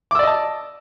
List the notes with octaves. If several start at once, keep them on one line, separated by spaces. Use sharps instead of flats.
D5 D#5 A5 D6 E6